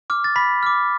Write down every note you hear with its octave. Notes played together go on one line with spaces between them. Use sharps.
D6 F6
A6
B5 B6
D6 F6